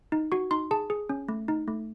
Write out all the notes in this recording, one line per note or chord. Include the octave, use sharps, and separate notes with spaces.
D#4
F#4 C#6
D#4 C6
G#4 A5
G#4
C#4
A3
D#4
A3